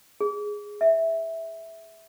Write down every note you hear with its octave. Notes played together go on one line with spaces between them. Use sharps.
G#4
E5